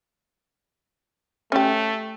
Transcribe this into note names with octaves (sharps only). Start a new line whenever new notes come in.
A3 C#4 G4